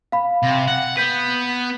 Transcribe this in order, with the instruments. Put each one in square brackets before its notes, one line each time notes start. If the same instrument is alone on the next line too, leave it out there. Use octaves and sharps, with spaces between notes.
[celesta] F5 B5
[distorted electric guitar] C3
F#5
[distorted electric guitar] B3 B4 [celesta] G6 B6